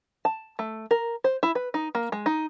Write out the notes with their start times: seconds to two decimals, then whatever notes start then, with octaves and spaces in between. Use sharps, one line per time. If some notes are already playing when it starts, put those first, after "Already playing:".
0.25 A5
0.59 A3
0.91 A#4
1.24 C5
1.43 E4
1.55 B4
1.74 D#4
1.95 A#3
2.12 G#3
2.26 D#4